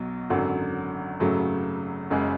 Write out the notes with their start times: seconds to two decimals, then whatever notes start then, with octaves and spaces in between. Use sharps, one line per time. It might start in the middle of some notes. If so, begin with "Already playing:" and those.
Already playing: B1 B2 F#3
0.30 G#1 F#2 D3 F#3
1.20 G#1 F#2 C#3 F#3 A3
2.10 F#1 F#2 C#3 G#3